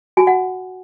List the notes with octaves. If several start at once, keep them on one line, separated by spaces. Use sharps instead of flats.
F#4 G#5
F#5